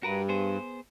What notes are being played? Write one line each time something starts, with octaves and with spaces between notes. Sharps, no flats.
G2 F#4 A#4 B4
B3 G#4 C5